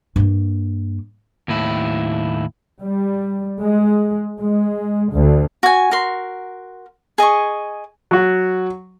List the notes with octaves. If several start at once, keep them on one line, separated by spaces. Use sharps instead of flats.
G2 A#3
D#2 A2 E4
G3
G#3
G#3
D2
F#4 G#5
F#4 A#4 C6
G#4 D#5 G#5 C#6
F#3 F#4